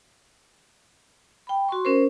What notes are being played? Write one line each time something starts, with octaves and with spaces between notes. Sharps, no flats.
G5 B5
F#4 C6 C#6
C#4 A#4 C5